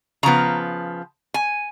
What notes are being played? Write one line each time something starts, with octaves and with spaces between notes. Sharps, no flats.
C#3 F3 B3 A#5
G#5